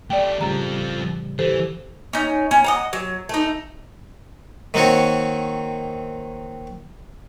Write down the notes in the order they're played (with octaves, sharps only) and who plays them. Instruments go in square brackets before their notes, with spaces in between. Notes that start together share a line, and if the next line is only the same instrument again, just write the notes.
[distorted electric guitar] A3 G4 [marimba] D5 G5
[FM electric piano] A2 C#3 G3 [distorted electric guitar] F3 A4 [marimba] A#5
[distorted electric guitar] E3 [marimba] G4 A4 C5
[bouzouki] C#4 D#4
C#4
D#5 F#5 A#5
F#3
A3 D#4
[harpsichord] D#3 A#3 C4 F#4 C#5